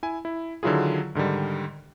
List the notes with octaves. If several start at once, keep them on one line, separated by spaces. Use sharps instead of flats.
E4 G#5
E4
D3 D#3 F#3 E4 F4 G#4
G#2 D3 D#3 G3